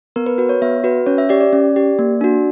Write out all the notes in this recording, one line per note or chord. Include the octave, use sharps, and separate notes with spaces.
B3 A#4
B4
F#4 B4
C#5
B3 E5
F#4 B4
C#4 C#5
E5
G4 D5
D5
C#4
G4
A#3
D4 F#4